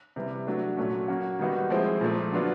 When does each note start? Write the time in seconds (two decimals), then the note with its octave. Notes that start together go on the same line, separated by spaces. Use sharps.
0.16 C3 E3 G3
0.47 F#3 A3 D4
0.77 A#2 F#3 A3 C#4
1.08 F#3 A#3 C#4 F#4
1.39 D#3 G3 B3 D#4 F#4
1.70 F3 G#3 C4 E4
2.01 A#2 F3 A3
2.32 D3 F#3 B3 D4 F4